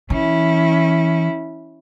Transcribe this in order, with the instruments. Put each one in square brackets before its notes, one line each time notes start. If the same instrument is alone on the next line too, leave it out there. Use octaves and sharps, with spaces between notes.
[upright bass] E3 [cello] C#4 E4